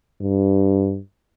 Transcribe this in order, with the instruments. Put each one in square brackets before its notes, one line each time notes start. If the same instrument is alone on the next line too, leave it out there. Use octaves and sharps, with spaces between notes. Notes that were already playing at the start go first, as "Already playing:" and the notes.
[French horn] G2